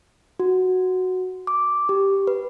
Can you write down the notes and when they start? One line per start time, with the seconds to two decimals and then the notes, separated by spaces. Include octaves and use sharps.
0.40 F#4
1.47 D6
1.89 G4
2.27 B4